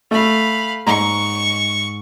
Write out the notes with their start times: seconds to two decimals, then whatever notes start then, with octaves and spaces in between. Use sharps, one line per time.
0.11 A3 F5 B5
0.87 G#2 A#5 C#6